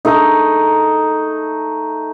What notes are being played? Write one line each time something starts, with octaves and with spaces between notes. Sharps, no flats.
A3 D#4